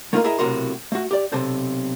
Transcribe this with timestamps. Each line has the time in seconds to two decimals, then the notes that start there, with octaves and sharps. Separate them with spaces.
0.13 A3 A#3 D#4 F4 G4 A#4
0.24 E4 G#4 A#4 D#5 E5
0.39 B1 A2 C3 F#4 A#4 C6
0.92 A3 F#4
1.11 G4 D5
1.32 B1 C3 A4 C5